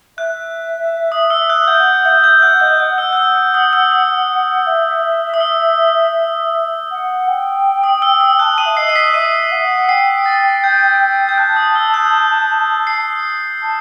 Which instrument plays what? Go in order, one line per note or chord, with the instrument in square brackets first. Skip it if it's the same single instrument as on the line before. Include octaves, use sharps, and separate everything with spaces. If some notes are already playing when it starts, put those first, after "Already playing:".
[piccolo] E5 [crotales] F#6
[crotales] D#6
E6
F#6
[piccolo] F#5 [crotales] G6
[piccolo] E5 [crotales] G6
[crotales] G6
[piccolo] F#5 [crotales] F#6
[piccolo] D#5 [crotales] G6
[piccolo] F#5 [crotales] F#6
[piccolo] F#5 [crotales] E6
[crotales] F#6
E6
D#6
E6
D#6
[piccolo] E5
[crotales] D#6
E6
[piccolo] F#5
G5
[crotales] D#6
E6
D#6
[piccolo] A5 [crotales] F#6
[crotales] D#6 D#7
[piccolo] E5
[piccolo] D#5 [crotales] C7
[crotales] C7
B6
[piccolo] E5 [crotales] D#6 D#7
[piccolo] F#5
[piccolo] G5 [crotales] C7
[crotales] A6
G6
G6
[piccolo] A5 [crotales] F#6
[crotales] D#6
E6
F#6
C7
[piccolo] A5